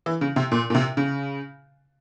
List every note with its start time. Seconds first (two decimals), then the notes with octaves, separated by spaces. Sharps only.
0.06 E3
0.21 C#3
0.36 C3
0.52 A#2
0.70 A#2
0.75 C3
0.97 C#3